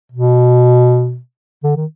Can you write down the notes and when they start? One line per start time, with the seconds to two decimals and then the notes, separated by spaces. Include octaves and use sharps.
0.12 B2
1.64 D3
1.76 D#3